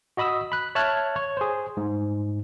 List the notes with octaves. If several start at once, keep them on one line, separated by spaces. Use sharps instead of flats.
F#4 D#5 B5 D#6 E6
B5 F#6
C#5 E5 A5 F6 F#6 G#6
C#5
G#4 C5
G#2